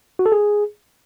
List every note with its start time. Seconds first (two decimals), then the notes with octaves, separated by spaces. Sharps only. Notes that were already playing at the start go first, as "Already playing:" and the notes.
0.19 F#4
0.26 A4
0.32 G#4